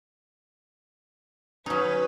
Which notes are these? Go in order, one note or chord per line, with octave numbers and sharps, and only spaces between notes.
F#3 C#4 D#4 B4 D#6